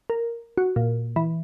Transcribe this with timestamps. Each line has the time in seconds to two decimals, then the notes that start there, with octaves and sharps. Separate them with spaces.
0.10 A#4
0.58 F#4
0.76 A#2
1.16 E3